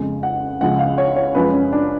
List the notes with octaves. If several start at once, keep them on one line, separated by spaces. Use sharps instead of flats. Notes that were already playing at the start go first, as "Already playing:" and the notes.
Already playing: F2 C#3 G#3
F#5
C#2 C#3 F3 G#3 F#5
F5
C#5
C#5
F#2 F3 G#3 B4
C#4
D4